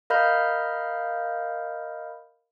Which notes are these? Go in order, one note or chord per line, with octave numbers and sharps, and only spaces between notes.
A#4 D#5 F5 B5 F6 G6